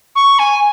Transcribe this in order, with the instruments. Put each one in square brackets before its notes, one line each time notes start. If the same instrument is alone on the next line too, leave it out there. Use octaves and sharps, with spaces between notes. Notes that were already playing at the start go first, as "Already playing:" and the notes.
[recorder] C#6
G#5